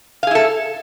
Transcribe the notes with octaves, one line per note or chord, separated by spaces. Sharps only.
E4 G#4 A4 F5